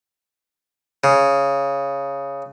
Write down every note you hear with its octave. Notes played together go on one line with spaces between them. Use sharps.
C#3